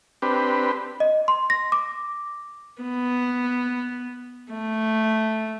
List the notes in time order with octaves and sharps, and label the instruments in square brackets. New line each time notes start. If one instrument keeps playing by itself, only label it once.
[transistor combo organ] C4 D4 G4 B4
[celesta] D#5
C6
A#6
D6
[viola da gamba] B3
A3